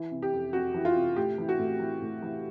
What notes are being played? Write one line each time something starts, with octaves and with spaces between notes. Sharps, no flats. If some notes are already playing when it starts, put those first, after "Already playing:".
Already playing: E3
C3
G4
F2
F2 F#4
E3
F4
C3
A2 G4
E3
F#4
A2
E3
A2
E3